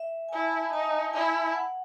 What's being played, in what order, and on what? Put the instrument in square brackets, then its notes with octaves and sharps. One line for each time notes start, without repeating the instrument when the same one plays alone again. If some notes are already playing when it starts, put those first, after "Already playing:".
Already playing: [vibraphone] E5
G#5
[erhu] E4 [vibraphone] A5
[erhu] D#4 [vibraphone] A5
[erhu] E4 [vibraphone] G#5
[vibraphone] F#5